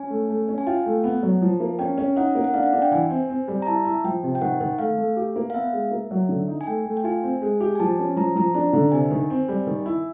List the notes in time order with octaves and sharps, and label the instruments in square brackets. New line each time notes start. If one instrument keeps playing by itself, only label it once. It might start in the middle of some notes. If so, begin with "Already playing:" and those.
Already playing: [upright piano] C#4 [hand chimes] G#5
[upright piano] A3
A3
C#4
[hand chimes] G#5
[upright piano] F4 [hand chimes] G5
[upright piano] A3
B3
F#3
F3
A#3
[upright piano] C#4 [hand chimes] G5
[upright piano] C#4
[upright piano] D#4 [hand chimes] F#5
[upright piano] A#3
[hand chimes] F#5
[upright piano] D4 [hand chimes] F5
[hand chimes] F#5
[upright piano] D4
[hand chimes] G5
[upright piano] E3 [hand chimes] G#5
[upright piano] C4
C4
G3
[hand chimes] A#5
[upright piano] E4 [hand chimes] A5
[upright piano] E4
[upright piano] F3 [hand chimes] G5
[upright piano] C3
[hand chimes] G5
[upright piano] D#3 [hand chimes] F#5
[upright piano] D#3
[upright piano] A3 [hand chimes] F5
[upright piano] A3
G4
A#3
[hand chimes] F5
[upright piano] B3 [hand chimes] E5
[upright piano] G#3
A#3
F#3
D3
D#4
[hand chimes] G#5
[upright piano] A3 [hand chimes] G5
[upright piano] A3
[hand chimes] G5
[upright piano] F4 [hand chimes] G#5
[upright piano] C4
G#3
G4
[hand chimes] G#5
[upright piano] F3 [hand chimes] A5
[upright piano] C#4
[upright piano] F3 [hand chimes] A#5
[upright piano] F3 [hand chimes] A#5
[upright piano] D4
D3
[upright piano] C3 [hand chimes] G#5
[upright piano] D#3
C4
G3
D#3
E4